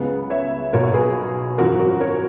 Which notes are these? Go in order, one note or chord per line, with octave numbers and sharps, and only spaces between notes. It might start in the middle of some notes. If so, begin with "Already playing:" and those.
Already playing: C#2 C#3 G#3 B3
C#5 E5
B1 B2 A#3 A#4 C#5
C#5
G#4 B4
G#1 F#2 E3 F#4 A#4
F#4 A#4
A#4 C#5